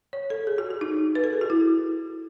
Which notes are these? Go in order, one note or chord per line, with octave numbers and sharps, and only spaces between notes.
C#5
A4
G#4
F#4
F#4
D#4
B4
A4
G#4
F#4
E4